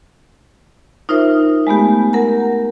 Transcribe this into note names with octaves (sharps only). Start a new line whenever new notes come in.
D#4 F4 A#4 C5 E5
G#3 A3 B3 G4
A#4 F#5 A#5